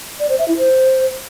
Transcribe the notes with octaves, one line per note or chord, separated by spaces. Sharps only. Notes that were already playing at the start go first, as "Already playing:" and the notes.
D5
C5
E5
E4
C5